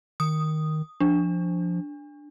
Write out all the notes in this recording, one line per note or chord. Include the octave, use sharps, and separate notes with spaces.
D#3 D#6
F3 D4